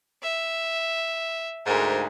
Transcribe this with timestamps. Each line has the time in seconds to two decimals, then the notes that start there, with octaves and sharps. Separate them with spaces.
0.23 E5
1.66 D2 G#2 A#4